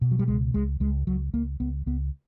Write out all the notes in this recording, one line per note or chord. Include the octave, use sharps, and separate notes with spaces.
B2
F#3
G3
C#2 G#3
C#2 G#3
C#2 G#3
C#2 F#3
C#2 A#3
C#2 B3
C#2 B3